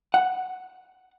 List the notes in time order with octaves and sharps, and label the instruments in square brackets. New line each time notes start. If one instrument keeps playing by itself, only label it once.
[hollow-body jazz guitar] F#5